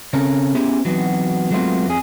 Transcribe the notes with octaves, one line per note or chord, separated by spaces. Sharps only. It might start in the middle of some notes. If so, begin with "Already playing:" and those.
C#3 C4 C#4 A4 A#4
B3 C#4 E4 G4 G#4 C5
E3 F#3 B3 C4 D#4 F#4
F#3 G#3 A3 B3 C4 F4
F2 G#4